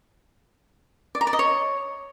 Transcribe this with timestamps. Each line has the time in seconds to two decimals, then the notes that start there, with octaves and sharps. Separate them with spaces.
1.15 D5
1.21 A#5
1.27 D5
1.33 D#5
1.39 C#5